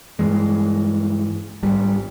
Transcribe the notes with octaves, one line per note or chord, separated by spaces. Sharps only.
G2 E3 G#3
G#1 G3